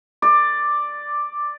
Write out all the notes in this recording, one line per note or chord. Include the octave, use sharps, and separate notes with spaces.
D5